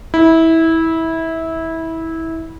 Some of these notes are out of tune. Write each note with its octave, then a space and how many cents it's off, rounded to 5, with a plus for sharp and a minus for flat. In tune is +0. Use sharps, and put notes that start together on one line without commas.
E4 -20